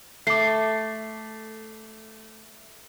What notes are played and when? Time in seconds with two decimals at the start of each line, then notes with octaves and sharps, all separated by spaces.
0.27 A3 D6 C7